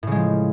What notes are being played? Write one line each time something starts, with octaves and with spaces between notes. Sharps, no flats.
A2 C#3 F3 G#3